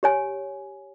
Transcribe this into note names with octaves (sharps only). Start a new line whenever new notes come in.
G4 C#5 G#5